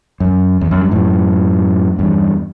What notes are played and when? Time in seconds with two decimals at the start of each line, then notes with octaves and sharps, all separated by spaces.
0.20 F#2
0.61 E2
0.71 F#2
0.81 G2
0.91 F#2 A2
1.99 E2 G2